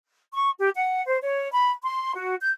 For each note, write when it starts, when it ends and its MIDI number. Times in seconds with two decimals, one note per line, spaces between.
0.34 0.50 85
0.60 0.70 67
0.75 1.02 78
1.07 1.18 72
1.22 1.51 73
1.53 1.72 83
1.83 2.13 84
2.16 2.35 66
2.41 2.51 91